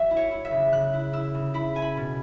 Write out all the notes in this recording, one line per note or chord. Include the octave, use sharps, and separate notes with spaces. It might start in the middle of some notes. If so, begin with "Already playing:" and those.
Already playing: F#3 E5
E4
C#5
E4
E5
C#3
C#3 F#6
E4
E4 E6
C#3
E4 B5
E4 G#5
B5
B2